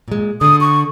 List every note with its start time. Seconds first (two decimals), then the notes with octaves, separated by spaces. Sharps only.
0.08 A#2 G#3
0.41 D3 D#6
0.61 C#6